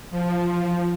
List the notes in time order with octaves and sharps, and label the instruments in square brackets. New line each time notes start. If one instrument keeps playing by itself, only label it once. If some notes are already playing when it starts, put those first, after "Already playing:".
[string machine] F3